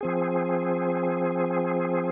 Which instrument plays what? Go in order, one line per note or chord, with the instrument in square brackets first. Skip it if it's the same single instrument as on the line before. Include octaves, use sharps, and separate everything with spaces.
[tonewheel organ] F3 C4 G#4